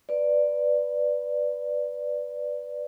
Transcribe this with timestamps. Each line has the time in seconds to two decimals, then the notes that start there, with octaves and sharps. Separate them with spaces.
0.09 B4 D5